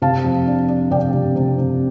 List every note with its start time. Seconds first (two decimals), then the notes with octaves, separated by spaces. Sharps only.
0.02 C3 F5 A5
0.25 F2
0.47 D4
0.68 D4
0.91 C3 D5 G5
1.14 C3
1.36 C3
1.58 C3